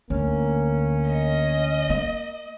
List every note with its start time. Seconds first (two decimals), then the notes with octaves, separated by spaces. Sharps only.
0.10 D2 A#3 C#4
1.10 D#5
1.90 A#3